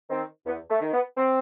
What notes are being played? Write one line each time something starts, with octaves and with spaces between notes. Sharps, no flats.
D#3 C4
E2 B3
A3
D#3
B3
C4